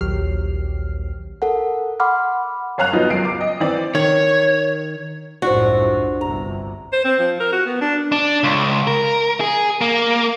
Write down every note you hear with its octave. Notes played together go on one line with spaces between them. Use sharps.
A#1 D#2 F#3 G4 F6 C7
A4 A#4 F#5
F#5 B5 C6 D6 F6
F#1 C#5 F5 A#5 F#6 F7
F3 F#3 B3 D#4 F4
F#1 C#2 F#3 C7 D7
D6
D#5
E3 C4 D5
D#3 C#5
C2 F#2 A2 D4 F4 F#4 C5
G1 C3 A#5
C5
C4
F3
A#4
F#4
B3
D4
D4
C#2
A#4
G#4
A#3